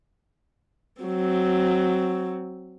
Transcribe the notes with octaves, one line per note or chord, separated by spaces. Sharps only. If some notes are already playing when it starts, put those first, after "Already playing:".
F#3 C4